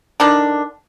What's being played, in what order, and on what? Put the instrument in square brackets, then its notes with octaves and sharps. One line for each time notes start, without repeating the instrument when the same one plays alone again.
[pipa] D3 D#3 D4